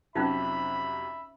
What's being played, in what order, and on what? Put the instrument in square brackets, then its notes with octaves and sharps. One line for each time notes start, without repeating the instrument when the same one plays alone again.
[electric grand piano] F2 C3 F#3 [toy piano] C#4 D#4 F4 [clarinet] E5 [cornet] B5